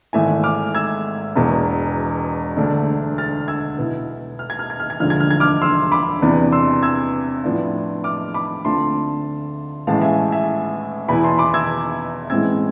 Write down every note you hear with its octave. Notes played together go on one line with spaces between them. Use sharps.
G#1 G#2 E3 A3 E5 G#5
D6 F6
E6 G#6
E1 E2 B2
E1 D2 D3 A3 D4
F6 A6
E6 G#6
B1 B2 B3 E4
F6
G#6
F6
G#6
F6
G#6
E1 D2 D3 F3 F6
G#6
F6
G#6
D6 F6
C6 E6
B5 D6
E2 C3 E3 B3 D4
C6 E6
E6 G#6
A2 F3 B3 D4 F4
D6 F6
B5 D6
D2 D3 A3 C4 F4 A5 C6
A1 A2 E3 G#3 F5 A5
E5 G#5
E5 G#5
E2 B2 B3 E4 G#5 B5
A5 C6
B5 D6
E6 G#6
A1 A2 G#3 C4 E4 E6 G#6